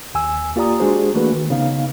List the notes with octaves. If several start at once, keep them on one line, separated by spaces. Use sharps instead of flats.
D#2 G#5 E6
A#3 F4 G4 D5 A#5 D#6
G#3 D4 F#4 G#4 C5
E3 A3 A#3 D4 F#4 B4
D#3
C#3 B3 D#4 F5